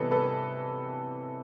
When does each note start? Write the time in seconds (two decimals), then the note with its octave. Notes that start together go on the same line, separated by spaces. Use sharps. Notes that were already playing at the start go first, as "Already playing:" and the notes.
Already playing: C3 E3 G3 B3 A4 B4 C#5 D#5
0.11 A4 B4